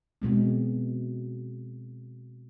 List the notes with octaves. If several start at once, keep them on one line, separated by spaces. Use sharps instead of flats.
B2 G#3 C4